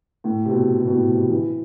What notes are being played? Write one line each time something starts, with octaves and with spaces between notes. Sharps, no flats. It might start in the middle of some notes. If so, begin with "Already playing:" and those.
A2
C3
B2
C3
B2
A2
C3
E3